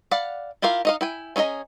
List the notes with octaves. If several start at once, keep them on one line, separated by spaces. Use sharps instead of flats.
D5 F5 F#5 B5
E4 F4 G4 A#4 F5
D#4 D#5 F5
E4 G5 G#5
C#4 E4 G#4 D#5 A#5